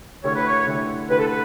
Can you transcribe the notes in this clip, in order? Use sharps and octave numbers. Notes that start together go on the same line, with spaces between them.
D3 A3 E4 G4 C#5
B4
C#5
D3 A3 E4 G4
D3 A3 E4 G4 B4
A4
B4